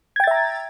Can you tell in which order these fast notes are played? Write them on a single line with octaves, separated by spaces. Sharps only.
G#6 G5 A6 E5 A#5